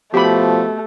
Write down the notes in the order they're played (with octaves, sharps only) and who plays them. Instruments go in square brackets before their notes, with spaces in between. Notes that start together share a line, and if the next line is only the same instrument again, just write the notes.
[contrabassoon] B2 [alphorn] F3 [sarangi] A3 [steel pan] G4 B5